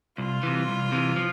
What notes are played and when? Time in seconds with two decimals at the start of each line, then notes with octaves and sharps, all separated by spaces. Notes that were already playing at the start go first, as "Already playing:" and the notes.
0.18 C2 F4
0.43 C3 E3
0.68 C2
0.92 C3 E3
1.16 F3